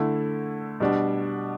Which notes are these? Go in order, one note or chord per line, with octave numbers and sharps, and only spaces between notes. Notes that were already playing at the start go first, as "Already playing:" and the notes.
Already playing: D3 A3 E4
B2 G3 D4